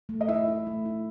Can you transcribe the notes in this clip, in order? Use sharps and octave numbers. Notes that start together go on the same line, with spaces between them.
A3
D#5
E4 E5
E4
A3
E4